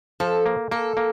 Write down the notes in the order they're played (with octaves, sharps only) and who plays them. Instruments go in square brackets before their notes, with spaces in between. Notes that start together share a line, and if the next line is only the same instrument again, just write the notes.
[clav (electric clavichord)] F3 [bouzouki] A4
[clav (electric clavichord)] A#3
[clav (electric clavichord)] A#3 [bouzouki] A4
[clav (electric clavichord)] A#3